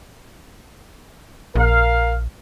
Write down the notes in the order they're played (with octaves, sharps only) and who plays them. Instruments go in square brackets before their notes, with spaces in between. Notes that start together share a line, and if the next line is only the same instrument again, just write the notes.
[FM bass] A#1 [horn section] A#4 F5